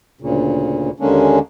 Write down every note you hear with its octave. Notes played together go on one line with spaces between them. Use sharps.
D2 A#2 C#3
D#2 D3 G#3 A#3 C#4 D4